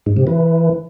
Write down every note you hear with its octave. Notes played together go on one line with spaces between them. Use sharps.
G#2
C3
E3